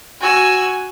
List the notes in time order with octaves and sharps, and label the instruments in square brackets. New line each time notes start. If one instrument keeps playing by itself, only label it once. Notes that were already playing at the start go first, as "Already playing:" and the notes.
[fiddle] F#4 E6 [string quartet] G#5